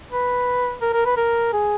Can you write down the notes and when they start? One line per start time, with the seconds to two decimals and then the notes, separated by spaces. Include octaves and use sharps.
0.12 B4
0.82 A#4
0.93 A#4
1.06 B4
1.17 A#4
1.53 G#4